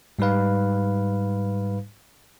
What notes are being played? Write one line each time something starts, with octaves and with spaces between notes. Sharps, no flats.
G#2 G3 D#4 B4 F5